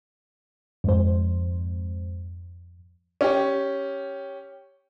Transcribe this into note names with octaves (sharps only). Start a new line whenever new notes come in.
F2 G#2 C5
C#4 G4